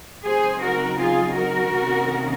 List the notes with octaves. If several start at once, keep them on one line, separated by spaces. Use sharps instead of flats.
C#3 F#3 C4 D#4 G#4 C5
F#4 A#4
F4 G#4
F#4 A#4
C3 D#3 A#3 C#4